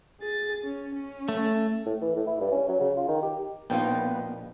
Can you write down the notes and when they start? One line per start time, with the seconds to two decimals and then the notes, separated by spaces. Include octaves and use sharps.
0.21 G#4 A6
0.64 C#4
0.94 C#4
1.29 A3
1.86 A2
2.01 E3
2.16 A2
2.27 E4
2.40 G2
2.52 C#4
2.68 F#3
2.80 C#3
2.97 F4
3.08 D#3
3.23 G4
3.70 A#1 B2 A#3 B3 D#4 F4 G5